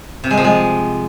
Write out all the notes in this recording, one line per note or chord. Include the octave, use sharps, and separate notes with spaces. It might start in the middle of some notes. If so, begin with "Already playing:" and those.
C3
G#3
F3
G#3